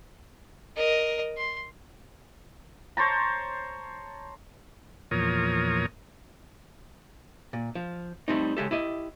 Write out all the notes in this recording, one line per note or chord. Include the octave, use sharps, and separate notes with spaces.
A#4 D#5
C6
C5 C#5 A5 A#5
E2 A#2 F3 A#4 C#5 D#6
A#2
F3
G3 A3 C4 D#4
C#3 G#3 G4 A4
E4 G4 D#5